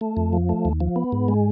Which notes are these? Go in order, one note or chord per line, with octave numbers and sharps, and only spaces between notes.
A3
F2
F3
A3
D#2
F3
B3
G#2
G#3